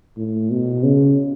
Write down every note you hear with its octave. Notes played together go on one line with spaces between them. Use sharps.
A2
B2
C#3